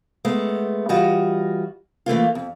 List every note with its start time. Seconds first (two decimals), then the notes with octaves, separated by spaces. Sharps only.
0.25 G#3 A3 B3
0.89 E3 G3 F4 F#4 D#5
2.06 E3 A3 A#3 F4
2.35 F2